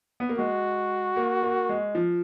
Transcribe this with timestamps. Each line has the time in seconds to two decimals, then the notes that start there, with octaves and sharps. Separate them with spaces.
0.20 B3
0.29 A#3
0.38 G#3 F#4
1.16 A#3
1.43 A#3
1.69 G#3
1.95 F3